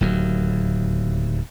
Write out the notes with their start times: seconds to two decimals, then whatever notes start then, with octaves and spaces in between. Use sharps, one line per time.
0.01 D1 D#2 F#3